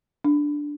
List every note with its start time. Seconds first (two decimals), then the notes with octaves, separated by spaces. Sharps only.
0.25 D4